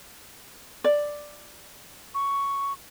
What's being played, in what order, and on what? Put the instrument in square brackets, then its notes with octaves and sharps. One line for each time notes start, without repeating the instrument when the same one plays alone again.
[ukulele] D5
[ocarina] C#6